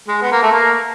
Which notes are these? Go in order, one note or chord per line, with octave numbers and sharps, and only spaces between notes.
G#3
B3
A#3
A3
A#3